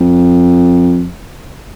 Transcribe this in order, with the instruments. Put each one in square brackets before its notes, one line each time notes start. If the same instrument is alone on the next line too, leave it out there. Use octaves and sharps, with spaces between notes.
[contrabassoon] F2